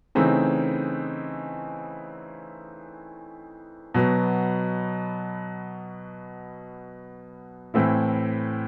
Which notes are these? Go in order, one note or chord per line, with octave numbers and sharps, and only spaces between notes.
C#3 E3 A3 C4 D#4
B2 F#3 B3
A2 E3 A3 C4 E4